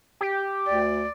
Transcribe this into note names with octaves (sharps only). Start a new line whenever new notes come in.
G4
D2 D5